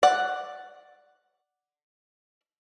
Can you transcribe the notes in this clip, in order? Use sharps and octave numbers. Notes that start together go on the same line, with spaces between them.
D5 F#5